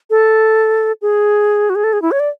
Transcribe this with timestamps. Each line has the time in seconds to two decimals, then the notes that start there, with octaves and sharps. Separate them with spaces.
0.10 A4
1.02 G#4
1.70 F#4
1.75 G#4
1.84 A4
1.93 G#4
2.02 E4
2.11 C#5
2.20 D5